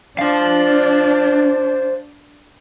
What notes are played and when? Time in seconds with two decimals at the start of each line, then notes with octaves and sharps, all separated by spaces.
0.19 D4 C5 F5